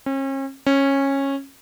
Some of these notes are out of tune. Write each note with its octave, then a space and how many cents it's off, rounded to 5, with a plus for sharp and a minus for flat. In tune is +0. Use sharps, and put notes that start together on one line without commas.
C#4 -40
C#4 -15